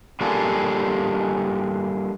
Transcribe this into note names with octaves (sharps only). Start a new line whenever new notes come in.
G3 A#3 D4 F4 G#4 A4